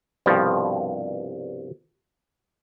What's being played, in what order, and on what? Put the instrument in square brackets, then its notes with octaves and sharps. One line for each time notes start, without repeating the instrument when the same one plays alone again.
[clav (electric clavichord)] C2 G2 B2 F3